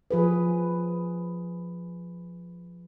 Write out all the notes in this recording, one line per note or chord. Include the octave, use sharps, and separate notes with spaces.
F3 G#4 B4